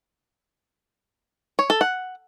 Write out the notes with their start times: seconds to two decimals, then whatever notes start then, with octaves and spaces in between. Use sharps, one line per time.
1.59 C#5
1.70 A4
1.81 F#5